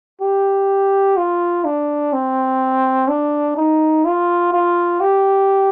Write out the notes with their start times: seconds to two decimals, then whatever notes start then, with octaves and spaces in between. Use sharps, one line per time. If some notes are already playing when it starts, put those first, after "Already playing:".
0.21 G4
1.17 F4
1.65 D4
2.13 C4
3.08 D4
3.57 D#4
4.05 F4
4.53 F4
5.01 G4